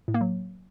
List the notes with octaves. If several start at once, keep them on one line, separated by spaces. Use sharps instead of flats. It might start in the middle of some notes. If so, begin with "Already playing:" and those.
A2
A#3
F#3